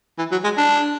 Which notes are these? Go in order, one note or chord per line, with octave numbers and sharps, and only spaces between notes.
E3
F#3
G#3
D4